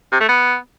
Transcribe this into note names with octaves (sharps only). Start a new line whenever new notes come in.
C3
A3
B3